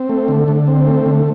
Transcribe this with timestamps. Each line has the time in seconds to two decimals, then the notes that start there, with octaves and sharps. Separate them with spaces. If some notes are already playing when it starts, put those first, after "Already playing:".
Already playing: C4
0.09 A3
0.28 D3
0.48 D3
0.67 C4
0.87 A3
1.06 D3